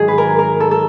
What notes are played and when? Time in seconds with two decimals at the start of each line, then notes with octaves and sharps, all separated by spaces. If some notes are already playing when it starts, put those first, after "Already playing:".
Already playing: G#2 D#3 F#3 G#4
0.08 B4
0.18 A#4
0.39 A#4
0.60 A4
0.71 A4